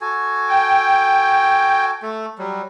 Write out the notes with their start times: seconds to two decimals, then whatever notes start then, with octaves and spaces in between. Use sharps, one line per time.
0.01 F#4 A4 G#5
0.49 G5
2.02 A3 A4
2.38 F#3 G3